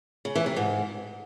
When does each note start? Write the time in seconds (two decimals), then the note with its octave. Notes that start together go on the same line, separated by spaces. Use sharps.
0.25 C#3
0.35 E3
0.46 C3
0.56 G#2